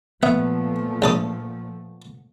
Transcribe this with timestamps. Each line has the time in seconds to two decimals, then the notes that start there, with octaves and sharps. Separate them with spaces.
0.23 A#2 F3 A3 B3 E5
1.02 A#1 A4 D#6